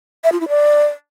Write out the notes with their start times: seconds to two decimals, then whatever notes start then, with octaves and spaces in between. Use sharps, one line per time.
0.24 E5
0.32 F4
0.40 E4
0.49 D5